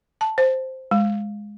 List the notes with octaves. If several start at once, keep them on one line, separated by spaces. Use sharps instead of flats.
A5
C5
G#3